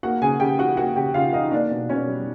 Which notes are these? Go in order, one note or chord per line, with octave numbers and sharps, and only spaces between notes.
A#3 F#4 F#5
C#3 G#4 G#5
C#3 G4 G5
F3 F#4 F#5
A#3 F#4 F#5
C#3 G4 G5
C#3 F4 F5
F3 D#4 D#5
A#3 D4 D5
B2
B2 C#4 C#5
G3